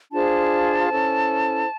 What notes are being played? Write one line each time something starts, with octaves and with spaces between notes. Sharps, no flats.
D4 F4 G#4 C5 A5
C#4 E4 A4 C5